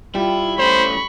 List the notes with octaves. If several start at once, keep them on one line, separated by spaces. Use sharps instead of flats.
G3 E4 F4
A3 C#4 C5 B5 C#6